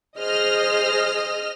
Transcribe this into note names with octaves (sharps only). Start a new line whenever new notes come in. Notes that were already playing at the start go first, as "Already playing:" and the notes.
G#4 C5 D#5 F6